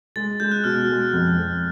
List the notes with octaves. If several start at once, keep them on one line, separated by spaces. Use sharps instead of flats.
G#3 A6
G#3 G6
F#6
B2 F6
G#3
F2
F2